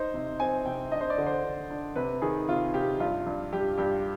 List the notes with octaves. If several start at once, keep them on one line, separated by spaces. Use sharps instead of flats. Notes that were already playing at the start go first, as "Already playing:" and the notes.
Already playing: D#4 C5
C3
C4 G#5
C3 G5
D4 D#5
C5
D5
D3
C5
D3
D4
C3 B4
D#3 G#4
C3 F4
C3 G4
G2 F4
G2
G2 G4
G2 G4